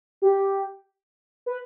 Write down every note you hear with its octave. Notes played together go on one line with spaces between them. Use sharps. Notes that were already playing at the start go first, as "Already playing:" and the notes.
G4
B4